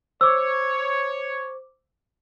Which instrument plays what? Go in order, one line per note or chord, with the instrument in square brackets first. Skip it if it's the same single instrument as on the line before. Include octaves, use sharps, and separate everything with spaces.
[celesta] C5 D6 [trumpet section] C#5 [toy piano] E6